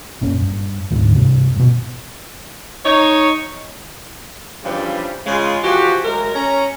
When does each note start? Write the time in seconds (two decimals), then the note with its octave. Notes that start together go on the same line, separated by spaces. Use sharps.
0.21 F#1 A#2 C#4
0.41 G2
0.91 D2 G#2 D3
1.15 G2 C3
1.56 G2 B2
2.85 D#4 C#5
4.64 G2 C#3 E3 F3 G3
5.26 C#3 G#3 F4
5.63 E3 F3 F#4 G4
6.04 F#3 G#3 A3 A#4
6.35 C#4 A#5